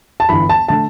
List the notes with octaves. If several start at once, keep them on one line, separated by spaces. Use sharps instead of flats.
A5
G1 G2 E3 B5
A5
D3 A3 A5